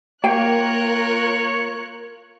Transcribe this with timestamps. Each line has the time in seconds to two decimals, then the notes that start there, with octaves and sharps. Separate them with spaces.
0.24 A#3 F4 A#4 C#5 G5 F#6